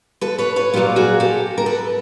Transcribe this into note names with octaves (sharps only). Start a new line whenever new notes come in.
A4 B4
B4 C#5
B4 C#5
A#2 F#3 A#3 F4 G4
F#4 G#4
G4 A4
A#4
A4 B4